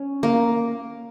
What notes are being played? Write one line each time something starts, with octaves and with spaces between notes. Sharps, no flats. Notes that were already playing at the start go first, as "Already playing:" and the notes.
Already playing: C#4
A#3